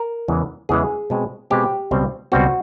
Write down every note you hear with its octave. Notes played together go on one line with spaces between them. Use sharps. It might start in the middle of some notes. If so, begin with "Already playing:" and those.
Already playing: A#4
E2 C#3 E3 G#3
E2 C#3 E3 G#3 G#4
B2 G#3 C4
B2 G#3 C4 G4
C#2 B2 G3 C4
C#2 B2 G3 C4 F#4